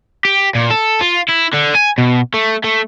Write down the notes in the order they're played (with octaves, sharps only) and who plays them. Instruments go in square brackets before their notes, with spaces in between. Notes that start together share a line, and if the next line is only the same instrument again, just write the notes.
[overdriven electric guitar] G4
A#2
A4
F4
E4
D3
G#5
B2
A3
A3